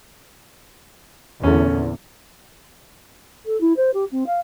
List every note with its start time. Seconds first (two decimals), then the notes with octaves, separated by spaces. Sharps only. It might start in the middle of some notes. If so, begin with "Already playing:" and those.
1.43 E2 A#2 D3 A3 C#4
3.45 A4
3.60 E4
3.76 C5
3.93 G4
4.11 C4
4.26 F5